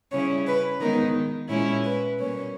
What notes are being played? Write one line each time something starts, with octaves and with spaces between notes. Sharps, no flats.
C#3 G3 C#4 E4 C#5
B4
D#3 G#3 B3 D#4 A#4
A#2 G#3 C#4 E4 C#5
B4
B2 G3 A#3 C#4 C#5